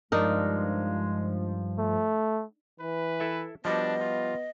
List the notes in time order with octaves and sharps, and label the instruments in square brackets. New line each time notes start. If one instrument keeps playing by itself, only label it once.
[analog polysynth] G2 F3 [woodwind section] G#3 [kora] D4 D#4 A#4
[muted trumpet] A3
[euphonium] E3 [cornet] B4
[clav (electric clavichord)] E4 A4 E5
[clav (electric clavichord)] F3 G3 F#4 [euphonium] B3 [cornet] D4 [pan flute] D#5
[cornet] F4